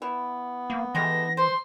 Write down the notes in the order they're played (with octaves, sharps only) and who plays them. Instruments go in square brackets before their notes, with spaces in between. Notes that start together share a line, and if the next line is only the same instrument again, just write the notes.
[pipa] E3 [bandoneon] B3
[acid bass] A#3
[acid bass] E3 [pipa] G#3 A3 G4 [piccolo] A#6
[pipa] C5 [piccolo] C6